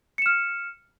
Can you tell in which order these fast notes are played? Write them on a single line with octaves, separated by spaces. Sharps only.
C#7 E7 F6